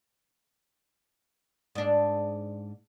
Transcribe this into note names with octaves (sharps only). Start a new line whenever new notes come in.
G#2 D4